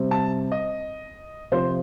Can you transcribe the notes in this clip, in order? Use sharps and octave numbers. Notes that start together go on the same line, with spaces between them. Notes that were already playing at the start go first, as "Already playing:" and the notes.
Already playing: C3 G3 C4
A5
D#5
C3 F3 C4 C5